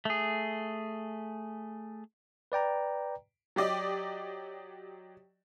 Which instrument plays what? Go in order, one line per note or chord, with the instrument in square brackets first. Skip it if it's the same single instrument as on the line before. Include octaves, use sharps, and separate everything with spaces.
[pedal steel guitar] A3 G#4
[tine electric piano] B4 D5 G5 A#5
[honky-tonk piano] F#3 G4 D5 D#5